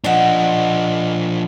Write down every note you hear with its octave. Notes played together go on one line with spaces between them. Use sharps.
F3 D4 D#5 F#5